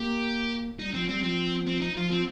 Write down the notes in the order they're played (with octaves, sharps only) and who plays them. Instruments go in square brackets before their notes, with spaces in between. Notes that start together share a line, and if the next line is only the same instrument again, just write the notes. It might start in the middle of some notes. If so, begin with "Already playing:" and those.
Already playing: [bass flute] A#3 [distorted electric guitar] G4
[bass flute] G3 [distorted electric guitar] D#4
[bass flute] F3 [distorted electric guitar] C4
[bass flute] G3 [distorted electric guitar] C4
[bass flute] F3 [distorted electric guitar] C4
[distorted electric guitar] C4
D#4
[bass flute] F3 [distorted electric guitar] F4
[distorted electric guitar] C4